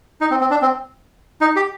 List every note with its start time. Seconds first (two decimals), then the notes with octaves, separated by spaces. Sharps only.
0.21 D#4
0.31 C4
0.41 C4
0.50 D4
0.62 C4
1.41 D#4
1.56 G4